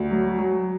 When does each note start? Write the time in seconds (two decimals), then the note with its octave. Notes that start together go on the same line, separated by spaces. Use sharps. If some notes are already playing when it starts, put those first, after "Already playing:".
Already playing: D2
0.11 F#3
0.39 F#3